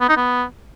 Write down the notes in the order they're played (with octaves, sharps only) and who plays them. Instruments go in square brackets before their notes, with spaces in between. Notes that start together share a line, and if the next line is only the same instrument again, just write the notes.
[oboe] B3
D#4
B3